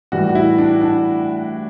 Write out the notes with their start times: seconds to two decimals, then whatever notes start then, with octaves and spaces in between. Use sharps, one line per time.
0.12 A2 E3 G3 F#4
0.29 F#4
0.35 E4
0.58 D4
0.81 D4